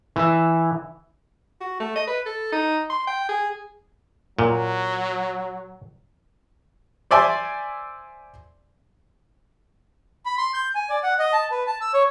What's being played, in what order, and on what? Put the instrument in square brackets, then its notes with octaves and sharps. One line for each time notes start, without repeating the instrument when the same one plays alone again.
[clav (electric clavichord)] E3 E5
[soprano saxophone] F#4
A3
D#5
B4
A4
D#4
C6
G5
G#4
[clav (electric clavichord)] A#2 [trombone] F#3
[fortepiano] C5 D5 E5 G#5 C6
[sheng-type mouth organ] B5
C6
G6
G#5
D5
F#5
D#5
A5
B4
A5
E6
C#5